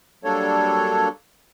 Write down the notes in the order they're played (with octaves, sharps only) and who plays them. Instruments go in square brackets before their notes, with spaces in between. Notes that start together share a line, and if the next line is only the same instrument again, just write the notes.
[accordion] F#3 G3 A#3 D4 A4 C#5